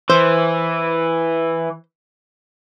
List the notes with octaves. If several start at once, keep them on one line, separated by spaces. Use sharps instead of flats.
E3 C5